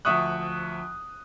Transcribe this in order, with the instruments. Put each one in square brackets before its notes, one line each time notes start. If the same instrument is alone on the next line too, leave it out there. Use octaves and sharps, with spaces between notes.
[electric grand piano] D2 F3 E5 C#6 D#6 F#6